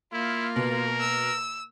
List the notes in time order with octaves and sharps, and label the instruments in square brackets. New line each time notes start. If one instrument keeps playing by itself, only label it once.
[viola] A#3 [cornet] E4 [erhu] F4
[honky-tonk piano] B2 [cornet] A#4
[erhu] E6